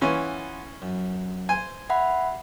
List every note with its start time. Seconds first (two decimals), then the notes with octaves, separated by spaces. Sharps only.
0.01 E3 B3 C#4 F4
0.82 F#2
1.49 C5 G#5
1.90 E5 F#5 B5